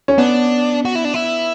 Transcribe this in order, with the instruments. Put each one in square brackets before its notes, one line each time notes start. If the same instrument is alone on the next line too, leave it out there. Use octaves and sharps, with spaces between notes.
[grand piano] C#4
[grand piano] B3 [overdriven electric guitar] D4
[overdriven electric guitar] F#4
E4
D4
E4